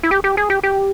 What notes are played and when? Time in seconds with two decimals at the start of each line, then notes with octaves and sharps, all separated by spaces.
0.03 E4
0.11 G4
0.24 G4
0.37 G#4
0.50 G4
0.63 G4